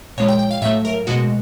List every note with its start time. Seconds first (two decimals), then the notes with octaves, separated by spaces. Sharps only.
0.18 A#2 F3 G#3 C#5
0.28 G5
0.39 G5
0.51 F5
0.62 A2 F#3 A3 E5
0.85 A#4
1.07 B2 G#3 F#4